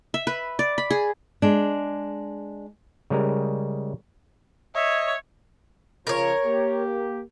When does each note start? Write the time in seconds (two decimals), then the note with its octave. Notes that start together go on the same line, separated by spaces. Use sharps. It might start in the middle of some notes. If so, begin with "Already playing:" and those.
0.14 E5
0.27 B4
0.59 D5
0.78 B5
0.91 G#4
1.42 G#3 D4
3.10 C#3 G3 G#3 A#4
4.75 C#5 D#5 E5
6.07 C#3 F3 A#4 C#5
6.45 A#3 G4